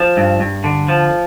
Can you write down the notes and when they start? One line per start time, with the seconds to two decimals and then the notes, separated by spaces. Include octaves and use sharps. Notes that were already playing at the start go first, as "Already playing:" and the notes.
Already playing: F3
0.17 G2
0.40 G2
0.64 D3
0.89 F3